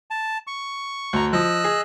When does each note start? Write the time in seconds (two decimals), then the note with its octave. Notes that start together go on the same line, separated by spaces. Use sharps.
0.11 A5
0.47 C#6
1.13 D2 A#5
1.33 F3 D#5 E6 F#6
1.64 G#4